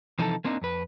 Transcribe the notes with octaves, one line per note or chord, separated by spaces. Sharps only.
C3 E3 F3 D#4 E4 A4
A#3 C4 D4 D#4
F2 B4